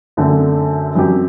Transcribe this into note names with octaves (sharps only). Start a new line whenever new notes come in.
F#2 D3 A3 C4
F#2 F#3 C4 G4